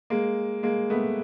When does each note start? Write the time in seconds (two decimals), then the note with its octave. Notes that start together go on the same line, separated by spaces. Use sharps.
0.10 G#3 A#3
0.63 G#3 A#3
0.90 A3 B3